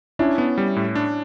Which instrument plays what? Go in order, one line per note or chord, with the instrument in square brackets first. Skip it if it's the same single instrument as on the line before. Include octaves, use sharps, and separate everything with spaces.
[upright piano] C#4 E4 [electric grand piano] D4
[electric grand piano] B3
G3
A2
D4